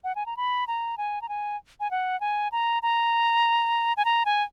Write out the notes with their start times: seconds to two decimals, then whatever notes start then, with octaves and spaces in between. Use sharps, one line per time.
0.04 F#5
0.16 G#5
0.26 A#5
0.37 B5
0.68 A#5
0.98 G#5
1.22 A#5
1.29 G#5
1.80 G#5
1.91 F#5
2.21 G#5
2.52 A#5
2.83 A#5
3.97 G#5
4.05 A#5
4.26 G#5